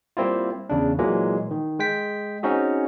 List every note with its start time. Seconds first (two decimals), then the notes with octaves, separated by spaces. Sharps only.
0.17 G3 A#3 C4 E4 F4
0.69 E2 C#3 D4
0.99 A#2 E3 F#3 G#3 A#3
1.51 D#3
1.79 G#3 G5 B6
2.43 C4 C#4 D#4 F#4 G#4